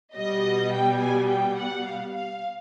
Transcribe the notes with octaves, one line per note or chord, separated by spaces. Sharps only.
B2 G3 B3 D#5
G5
G#5
G5
F#5
F5
F5